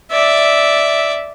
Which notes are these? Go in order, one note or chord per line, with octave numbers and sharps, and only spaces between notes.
D5 E5